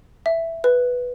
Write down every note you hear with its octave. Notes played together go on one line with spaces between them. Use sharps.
E5
B4